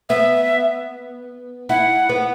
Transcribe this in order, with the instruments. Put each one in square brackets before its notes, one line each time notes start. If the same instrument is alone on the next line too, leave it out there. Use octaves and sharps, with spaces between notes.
[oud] B3 [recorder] E5
[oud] E4 [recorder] F#5
[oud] B3